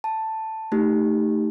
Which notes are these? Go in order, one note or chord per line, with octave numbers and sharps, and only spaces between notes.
A5
A3 D#4 G4